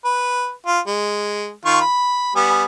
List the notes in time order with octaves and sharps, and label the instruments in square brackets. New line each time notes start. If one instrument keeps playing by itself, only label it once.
[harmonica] B4
F4
G#3
D#3 F4 C#6
B5
G3 B3 G#5